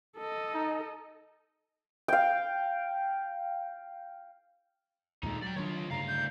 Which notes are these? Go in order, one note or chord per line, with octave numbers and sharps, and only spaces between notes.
A4 D#5
D#4
F5 G5
D#2 A#2 D3 G#3 D#4
F#3 D5 G5
D#3 F#3 D4 F4 C#5
D2 G2 C#3 F5 A#5
G6